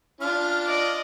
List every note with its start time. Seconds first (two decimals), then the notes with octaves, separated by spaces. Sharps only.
0.21 D4 F4 F6
0.65 D5 D#5